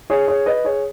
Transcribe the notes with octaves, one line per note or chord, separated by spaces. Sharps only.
G#4 C#5
G#4 C#5
B4 D#5
G#4 C#5